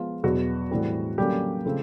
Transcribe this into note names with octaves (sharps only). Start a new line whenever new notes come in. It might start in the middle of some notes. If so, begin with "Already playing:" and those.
Already playing: F3 G#3 B3 F4
E2 B2 F#3 B3 F#4
A2 E3 G3 C4
D3 F#3 G3 A#3 C#4 G4
C#3 F3 A3 C4